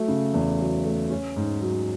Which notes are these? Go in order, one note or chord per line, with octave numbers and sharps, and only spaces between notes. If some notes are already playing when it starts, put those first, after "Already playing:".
Already playing: F#3 A3
C#3
E2
F#3
A3
C#4
G#2
F#3